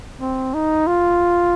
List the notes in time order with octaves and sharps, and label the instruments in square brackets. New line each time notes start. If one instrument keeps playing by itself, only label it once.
[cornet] C4
D#4
F4